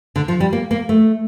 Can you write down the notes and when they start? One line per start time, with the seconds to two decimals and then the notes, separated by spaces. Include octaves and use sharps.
0.16 D3
0.28 F3
0.40 G3
0.53 A#3
0.71 A#3
0.89 A3